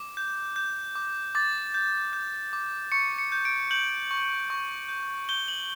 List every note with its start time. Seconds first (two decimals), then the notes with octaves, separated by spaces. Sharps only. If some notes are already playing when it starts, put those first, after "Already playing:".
Already playing: D6
0.17 G6
0.56 G6
0.95 D6
1.35 D6 A6
1.74 G6
2.13 G6
2.53 D6
2.92 C#6 C#7
3.18 C#7
3.32 G6
3.45 D7
3.71 G6 F#7
4.11 C#6
4.50 C#6
4.89 G6
5.29 G6 G7
5.48 F#7